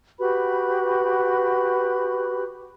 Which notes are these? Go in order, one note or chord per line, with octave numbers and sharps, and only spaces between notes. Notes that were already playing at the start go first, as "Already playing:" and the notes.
F#4 G4 B4 B5